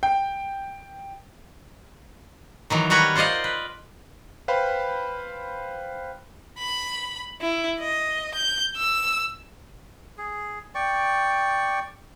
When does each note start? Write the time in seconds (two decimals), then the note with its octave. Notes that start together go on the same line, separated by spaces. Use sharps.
0.03 G5
2.70 D#3 E3 F#3
2.90 G3 F#4 A#4 B4 C#5 A#5
3.15 F4 C5 D5 D#5 F5
3.44 B4
4.48 B4 C5 F5 G5 B5
6.58 B5
7.41 E4
7.80 D#5
8.35 G6
8.76 E6
10.18 G#4
10.75 D5 G5 C#6